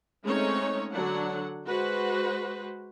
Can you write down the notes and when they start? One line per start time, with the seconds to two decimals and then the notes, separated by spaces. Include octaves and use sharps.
0.25 G#3 A3 C4 C#4 D#4 C#5
0.91 D3 F#3 D4 F#5
1.67 G#3 F#4 B4 C5